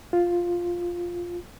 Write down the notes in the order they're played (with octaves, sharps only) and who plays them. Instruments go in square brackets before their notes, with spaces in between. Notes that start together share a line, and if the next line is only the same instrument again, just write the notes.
[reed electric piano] F4